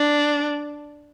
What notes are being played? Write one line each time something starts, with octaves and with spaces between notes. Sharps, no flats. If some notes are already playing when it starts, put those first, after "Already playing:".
Already playing: D4